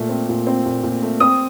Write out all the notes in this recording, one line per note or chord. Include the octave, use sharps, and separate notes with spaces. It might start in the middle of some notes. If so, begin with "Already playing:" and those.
Already playing: A#2 A3
C4
A#2
C4
A#2
A#2
A3
C4 D#6